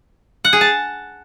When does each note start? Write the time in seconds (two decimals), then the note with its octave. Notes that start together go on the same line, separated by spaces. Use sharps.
0.45 F#5
0.53 G#4
0.61 A5